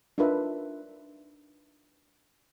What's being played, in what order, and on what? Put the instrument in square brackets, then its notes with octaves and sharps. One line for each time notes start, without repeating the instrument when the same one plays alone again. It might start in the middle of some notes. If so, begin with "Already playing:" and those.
[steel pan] D4 D#4 F4 A#4 B4 E5